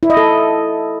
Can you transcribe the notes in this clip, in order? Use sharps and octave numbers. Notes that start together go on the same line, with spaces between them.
E4
D#5
A4